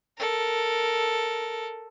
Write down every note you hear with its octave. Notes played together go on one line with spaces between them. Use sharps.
A4 A#4